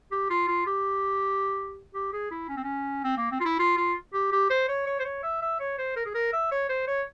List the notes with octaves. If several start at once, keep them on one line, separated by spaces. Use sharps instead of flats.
G4
F4
F4
G4
G4
G#4
E4
C#4
C4
C#4
C4
A#3
C4
F4
E4
F4
F4
G4
G4
C5
C#5
C#5
C5
C#5
E5
E5
C#5
C5
A#4
G#4
A#4
E5
C#5
C5
C#5